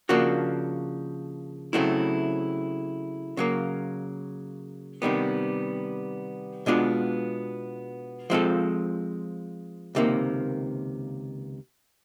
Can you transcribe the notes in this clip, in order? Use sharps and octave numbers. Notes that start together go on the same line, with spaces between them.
C#3 F3 A#3 D4 F#4
C#3 F#3 A3 C4 E4
C#3 F#3 A#3
C3 D#3 G3 B3
B2 G#3 B3 D4 F4
F3 G#3 C4 F4 A4
C#2 C3 D#3 G3 A#3